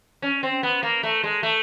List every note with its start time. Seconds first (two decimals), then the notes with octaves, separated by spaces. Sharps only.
0.22 C#4
0.43 C4
0.63 B3
0.83 A#3
1.03 A3
1.24 G#3
1.43 A3